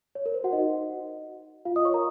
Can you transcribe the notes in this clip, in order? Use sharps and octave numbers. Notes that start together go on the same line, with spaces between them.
C#5
A#4
C5
F#4 F#5
D#4 D#5
F4 F5
D#5 D#6
C#5 C#6
A#4 A#5